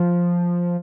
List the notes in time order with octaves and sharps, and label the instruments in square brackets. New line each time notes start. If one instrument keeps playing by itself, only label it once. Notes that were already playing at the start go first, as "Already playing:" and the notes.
Already playing: [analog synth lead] F3